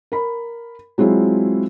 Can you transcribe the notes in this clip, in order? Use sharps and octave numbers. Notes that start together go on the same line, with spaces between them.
A#4 B5
F#3 G#3 C4 E4 F4